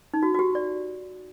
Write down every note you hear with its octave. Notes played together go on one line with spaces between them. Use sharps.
D#4
F#4
F#4
G4
D5